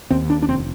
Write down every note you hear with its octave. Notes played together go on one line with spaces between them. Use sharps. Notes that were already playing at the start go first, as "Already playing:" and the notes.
D#2 C4
D4
D4
F1 C4